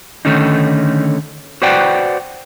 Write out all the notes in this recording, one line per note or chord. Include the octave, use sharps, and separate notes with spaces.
D3 D#3 A3 C#4 D#4
F#4 B4 C5 D5 F#5 G5